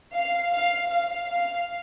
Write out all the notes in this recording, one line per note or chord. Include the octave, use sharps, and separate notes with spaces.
F5
F5
F5
F5